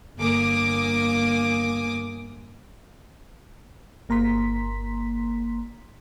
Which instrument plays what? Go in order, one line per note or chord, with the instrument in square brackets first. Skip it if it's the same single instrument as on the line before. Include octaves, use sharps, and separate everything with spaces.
[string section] G1 A#3 G#5 D6 D#6
[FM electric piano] G1 A#3 A#5 C6 B6